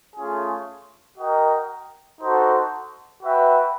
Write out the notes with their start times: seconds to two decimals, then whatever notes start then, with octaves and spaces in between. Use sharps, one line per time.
0.16 A3 C#4 F4 G#4
1.18 F#4 A#4 D#5 G5
2.21 D#4 F#4 A4 C5
3.23 F#4 B4 E5 G5